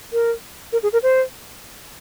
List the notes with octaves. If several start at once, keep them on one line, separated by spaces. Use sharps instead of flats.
A#4
A#4
G#4
A#4
C5